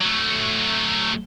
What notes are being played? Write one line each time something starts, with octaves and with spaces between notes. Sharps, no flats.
F#3 A3